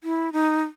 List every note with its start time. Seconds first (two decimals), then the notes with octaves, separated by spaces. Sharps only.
0.04 E4
0.33 D#4